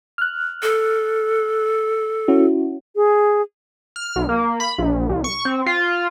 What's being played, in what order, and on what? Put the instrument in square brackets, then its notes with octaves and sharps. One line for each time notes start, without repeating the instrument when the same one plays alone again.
[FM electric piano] F6 F#6
[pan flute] A4
[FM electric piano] C#4 E4 F#4
[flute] G#4
[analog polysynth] F6
B1
A#3
B5
A#1
C2
C#6
C4
F4